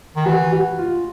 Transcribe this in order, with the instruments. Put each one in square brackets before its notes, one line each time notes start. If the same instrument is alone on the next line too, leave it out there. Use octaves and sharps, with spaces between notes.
[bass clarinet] D#3
[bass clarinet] E3 [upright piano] F#4
[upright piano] F#4
F4